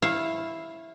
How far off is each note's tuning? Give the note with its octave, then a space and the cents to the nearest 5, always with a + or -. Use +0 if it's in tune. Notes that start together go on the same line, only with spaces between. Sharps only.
E4 +0 C#5 -35 F5 +0